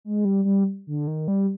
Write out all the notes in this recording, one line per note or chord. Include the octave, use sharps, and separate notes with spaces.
G#3
G3
G3
D3
D#3
G3